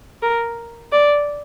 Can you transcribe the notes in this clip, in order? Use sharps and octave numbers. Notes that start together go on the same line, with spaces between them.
A#4
D5